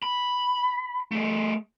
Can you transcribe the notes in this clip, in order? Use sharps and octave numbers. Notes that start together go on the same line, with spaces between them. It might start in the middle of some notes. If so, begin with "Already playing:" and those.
B5
A3 G#4